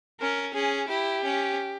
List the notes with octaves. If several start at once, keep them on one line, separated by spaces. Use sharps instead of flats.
C#4 A#4
C#4 G#4
E4 G4
C#4